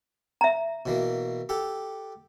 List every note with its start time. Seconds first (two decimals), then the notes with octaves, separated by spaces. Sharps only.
0.41 E5 A#5
0.86 B2 E3 A#3
1.49 G4 A4 F#5